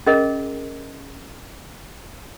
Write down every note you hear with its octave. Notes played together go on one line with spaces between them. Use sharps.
C#4 G#4 A#4 D#5